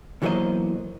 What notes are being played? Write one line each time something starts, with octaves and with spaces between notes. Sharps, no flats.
B1 E3 F#3 A#3 C5 D#5